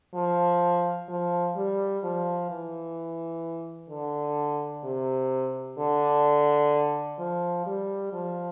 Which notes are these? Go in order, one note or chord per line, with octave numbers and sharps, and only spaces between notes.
F3
F3
G3
F3
E3
D3
C3
D3
F3
G3
F3